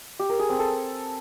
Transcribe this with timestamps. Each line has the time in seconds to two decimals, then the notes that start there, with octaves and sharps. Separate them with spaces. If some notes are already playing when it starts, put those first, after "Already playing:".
0.19 G4
0.29 A#4
0.39 G#4
0.49 C4
0.59 A4